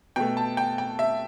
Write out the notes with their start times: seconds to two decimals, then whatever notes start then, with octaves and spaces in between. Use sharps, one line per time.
0.16 B2 A3 G5
0.37 A5
0.57 G5
0.78 G5
0.99 E5